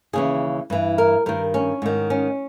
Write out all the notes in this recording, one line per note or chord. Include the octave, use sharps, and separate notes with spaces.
D#2 C#3 E3 G#4
G2 E3
A#4
G2 D#3 A#4
C#4
G#2 D#3
C#4